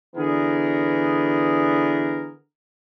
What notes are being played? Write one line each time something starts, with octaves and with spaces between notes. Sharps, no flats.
D3 E3 B3 G#4 A#4